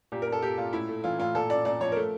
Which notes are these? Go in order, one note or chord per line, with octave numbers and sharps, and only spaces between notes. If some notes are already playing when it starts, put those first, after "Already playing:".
A#2 G4
A#4
A#2
A4
A#2 G4
A#2 F4
A2 E4
A3
E3 F4
A2 F4
A#2 A4
A#2 D5
A#2 D5
F3 C#5
A3 A#4